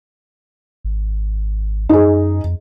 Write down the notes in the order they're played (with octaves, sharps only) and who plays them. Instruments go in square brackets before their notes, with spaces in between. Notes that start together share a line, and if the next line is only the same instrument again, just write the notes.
[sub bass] G#1
[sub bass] F#2 [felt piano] D#4 G#4
[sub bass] F2